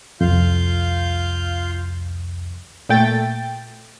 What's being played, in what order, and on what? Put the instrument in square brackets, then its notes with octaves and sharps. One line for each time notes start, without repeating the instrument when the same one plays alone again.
[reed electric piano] C2 F2 [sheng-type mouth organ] F4 F5 G6
[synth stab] A#2 A3 G5 A6